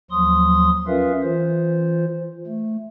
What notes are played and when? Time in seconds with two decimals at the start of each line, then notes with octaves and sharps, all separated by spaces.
0.11 D#2 F3 F#3 C6 D#6
0.87 C#4 F4 A#4 B4 E5 F5
1.22 E3 F4 C5
2.47 A3